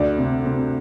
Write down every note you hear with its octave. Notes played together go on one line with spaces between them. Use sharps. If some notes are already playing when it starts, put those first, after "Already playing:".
Already playing: D2 D5
C3
C3